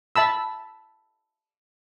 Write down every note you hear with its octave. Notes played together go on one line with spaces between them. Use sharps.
E5 A5 B5 E6